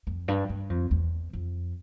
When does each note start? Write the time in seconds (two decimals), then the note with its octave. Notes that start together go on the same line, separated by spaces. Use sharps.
0.07 F2
0.28 G2
0.49 G2
0.70 F2
0.91 E2
1.33 F2